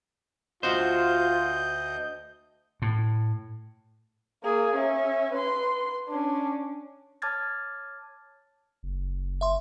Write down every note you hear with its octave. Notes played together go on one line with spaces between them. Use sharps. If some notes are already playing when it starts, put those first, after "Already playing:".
D2 F4 F#4 C5 D#5 G6
A2
A#3 G#4
C#4 E5
B4 C6
C#4 D4
C#5 A5 D6 F6 G#6 A6
F#1
E5 C6